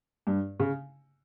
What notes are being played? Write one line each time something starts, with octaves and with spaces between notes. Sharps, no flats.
G2
C#3